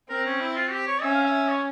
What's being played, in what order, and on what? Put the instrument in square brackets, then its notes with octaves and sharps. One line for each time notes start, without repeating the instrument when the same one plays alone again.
[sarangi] C4 [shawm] A#4
[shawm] C#4
E4
F4
G4
C#5
[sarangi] C#4 [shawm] E5
[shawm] F5
E5
C#5